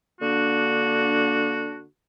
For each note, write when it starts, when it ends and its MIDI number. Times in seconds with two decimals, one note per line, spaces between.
0.21 1.84 50
0.21 1.84 58
0.21 1.84 62
0.21 1.84 66